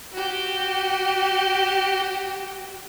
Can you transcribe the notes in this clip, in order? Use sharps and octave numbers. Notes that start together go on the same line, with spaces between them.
F#4 G4